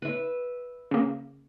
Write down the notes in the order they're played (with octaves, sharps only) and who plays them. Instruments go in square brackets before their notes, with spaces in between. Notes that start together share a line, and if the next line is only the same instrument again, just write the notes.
[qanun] B4 E5
[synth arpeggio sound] C#3 A#3